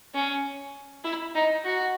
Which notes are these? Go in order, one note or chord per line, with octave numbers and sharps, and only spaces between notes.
C#4
E4
D#4
F#4